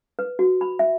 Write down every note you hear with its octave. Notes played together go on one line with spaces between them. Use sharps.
B4
F#4
B5
E5